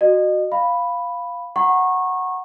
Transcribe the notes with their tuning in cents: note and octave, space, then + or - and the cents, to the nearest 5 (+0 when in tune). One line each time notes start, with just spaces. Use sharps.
F#4 +0 D#5 -30
F5 +0 B5 +0
F#5 +0 A#5 +10 C#6 -25